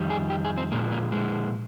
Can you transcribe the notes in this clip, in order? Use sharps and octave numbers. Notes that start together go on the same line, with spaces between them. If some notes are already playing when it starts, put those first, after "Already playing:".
Already playing: F2 D#3 G3
G#4
G4
G#4
C4
A#2 F3 G#3 A#3
A#3
G#3